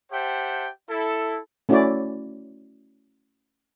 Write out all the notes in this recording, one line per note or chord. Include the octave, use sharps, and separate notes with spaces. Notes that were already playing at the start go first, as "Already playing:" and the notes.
G4 C5 E5 F#5 G5 A5
E4 A4
A3 C#4 E4 F#4 C#5 D5